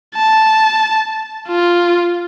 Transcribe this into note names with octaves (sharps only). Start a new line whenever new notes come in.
A5
F4